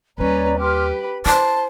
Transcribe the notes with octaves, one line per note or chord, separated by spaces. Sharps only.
D#2 G3 C#4 B4 C#5 D5 A#5
G4 B4 C6 D6 F6
B5
E4 C5 A5 C6